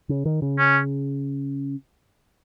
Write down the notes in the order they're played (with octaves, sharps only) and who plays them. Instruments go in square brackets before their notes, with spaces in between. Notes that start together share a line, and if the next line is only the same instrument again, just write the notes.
[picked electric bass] C#3
D#3
C#3
[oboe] C#4